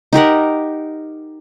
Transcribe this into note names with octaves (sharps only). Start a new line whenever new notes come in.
D#4 G4 A#4 F#5